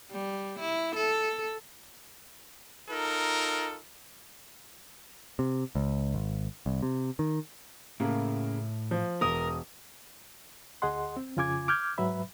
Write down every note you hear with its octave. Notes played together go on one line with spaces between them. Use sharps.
G3
E4
A4
D#4 F4 A4 A#4
C3
C#2
G#1
C2
C3
D#3
A2 C#3 A#3
F3
E1 A#4 D#6
D2 G#4 D#5 F#5 C6
C4
F2 C#3 F4 G#5 D6 G#6
D6 F6 G6 G#6
G#2 F#3 B4 E5 B5